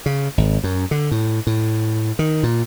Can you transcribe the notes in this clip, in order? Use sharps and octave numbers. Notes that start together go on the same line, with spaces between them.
C#3
G#1
F#2
D3
A2
A2
D#3
A#2